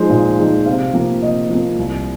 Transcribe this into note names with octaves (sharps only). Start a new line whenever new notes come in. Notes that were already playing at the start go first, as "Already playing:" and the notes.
Already playing: F3 G#3 D#4 C5
A#2
F3 G#3 D#4
C3 F5
F3 A#3
C3 D#5
F3 A#3
C2